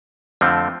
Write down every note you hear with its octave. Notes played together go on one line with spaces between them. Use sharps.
F2 D3 F3 A3 C4